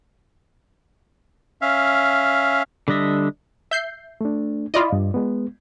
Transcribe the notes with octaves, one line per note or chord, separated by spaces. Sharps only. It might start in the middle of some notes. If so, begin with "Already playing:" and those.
C#4 E5 F5
D3 G3 D4 D#5 E5
E5 G6 C7
A3 D4
E4 F4 D5 D#5 B5
G2
G#3 B3